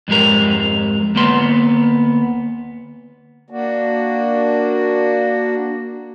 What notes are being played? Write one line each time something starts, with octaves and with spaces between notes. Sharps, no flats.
F2 G#2 G#3 G4 A#4
D2 A#3 B3 C6
A#3 D4 F#4